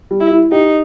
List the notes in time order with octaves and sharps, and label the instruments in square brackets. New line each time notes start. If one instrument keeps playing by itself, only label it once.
[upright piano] G3
[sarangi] E4
[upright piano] E4
[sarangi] D#4 [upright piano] G4